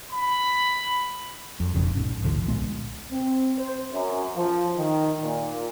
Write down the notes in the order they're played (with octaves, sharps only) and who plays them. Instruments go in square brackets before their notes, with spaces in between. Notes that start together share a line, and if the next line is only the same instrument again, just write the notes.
[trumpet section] B5
[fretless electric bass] F2
F1 B1 F2 C#3
A#1 G#2 C#4
A1 D2 D3 F3
C2 A#2 G#3 B3
[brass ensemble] C4
C5
F#2
F3
D#3
A#2